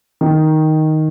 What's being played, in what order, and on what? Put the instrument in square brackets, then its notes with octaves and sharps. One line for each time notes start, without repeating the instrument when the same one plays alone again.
[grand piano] D#3